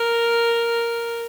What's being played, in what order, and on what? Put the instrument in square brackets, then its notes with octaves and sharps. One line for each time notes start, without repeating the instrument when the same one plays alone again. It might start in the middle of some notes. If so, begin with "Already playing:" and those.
Already playing: [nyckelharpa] A#4